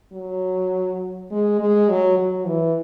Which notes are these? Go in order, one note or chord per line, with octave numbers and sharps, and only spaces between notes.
F#3
G#3
G#3
F#3
F#3
E3